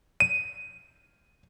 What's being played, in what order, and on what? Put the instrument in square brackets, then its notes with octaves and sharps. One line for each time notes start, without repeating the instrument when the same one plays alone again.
[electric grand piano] D#7